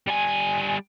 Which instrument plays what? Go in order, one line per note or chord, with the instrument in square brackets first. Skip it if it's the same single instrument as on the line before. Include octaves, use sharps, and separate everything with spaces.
[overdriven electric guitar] G3 G#5